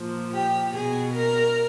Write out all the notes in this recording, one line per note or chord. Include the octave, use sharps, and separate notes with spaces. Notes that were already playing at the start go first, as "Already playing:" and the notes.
Already playing: A#2 F3
G4
B2 G#4
A#4